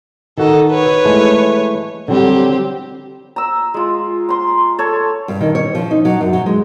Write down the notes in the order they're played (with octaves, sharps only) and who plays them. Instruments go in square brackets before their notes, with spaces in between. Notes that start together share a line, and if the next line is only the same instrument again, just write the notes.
[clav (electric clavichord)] D#3 F#4 A#5 [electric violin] D#4 A4
[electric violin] B4 C#5
[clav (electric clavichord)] E3 G#3 A3
[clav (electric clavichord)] D3 F#3 G3 [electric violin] C4 G4
[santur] A#5 E6
G#3 F4
A#5 C6
A4 C#5
[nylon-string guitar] G2
D#3
C#5
F3
D#4
F#3
F#2
F#3
G#3